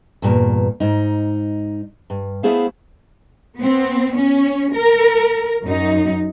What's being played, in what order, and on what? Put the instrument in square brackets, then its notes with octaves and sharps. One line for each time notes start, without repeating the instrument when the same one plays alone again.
[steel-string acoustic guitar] E2 G2 A#2
G#2 D#4
G2
A3 B3 E4 G#4 C5 F5
[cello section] B3 C4
C#4
A#4
F#2 D#4